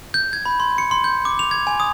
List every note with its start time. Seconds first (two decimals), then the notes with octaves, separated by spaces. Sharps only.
0.14 G6
0.33 G#6
0.46 B5
0.60 C6
0.78 C#7
0.91 C6
1.04 G6
1.25 D6
1.39 F7
1.51 G#6
1.67 G#5
1.80 D#6